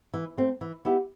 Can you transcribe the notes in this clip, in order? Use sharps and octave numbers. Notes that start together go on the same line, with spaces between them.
E3
A3 C4
E3
B3 E4 G4